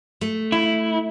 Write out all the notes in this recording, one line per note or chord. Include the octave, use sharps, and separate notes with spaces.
A3
E4